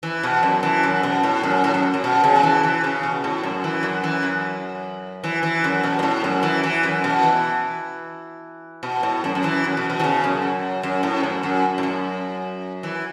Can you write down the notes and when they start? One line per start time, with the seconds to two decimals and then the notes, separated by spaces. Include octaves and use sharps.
0.03 E3
0.23 B2
0.43 F#2
0.63 E3
0.83 F#2
1.03 B2
1.23 A2
1.43 F#2
1.64 A2
1.74 F#2
1.94 F#2
2.04 B2
2.24 C#3
2.36 F#3
2.43 E3
2.63 E3
2.84 C#3
3.03 B2
3.24 A2
3.43 F#2
3.64 E3
3.83 F#2
4.04 E3
4.23 F#2
5.24 E3
5.43 E3
5.64 F#2
5.84 B2
5.99 F#2
6.03 A2
6.24 F#2
6.43 E3
6.63 E3
6.83 F#2
7.04 B2
7.23 E3
8.83 B2
9.03 A2
9.24 F#2
9.35 F#2
9.44 E3
9.64 F#2
9.77 B2
9.90 B2
9.99 E3
10.04 C#3
10.24 F#2
10.83 F#2
11.03 A2
11.23 F#2
11.43 F#2
11.78 A2
11.83 F#2
12.83 E3